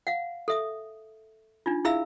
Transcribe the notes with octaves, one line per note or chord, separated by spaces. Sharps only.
F5 F#5
A4 E5 D#6
D4 D#4 F4
E4 G#4 E5 F5 B5 E6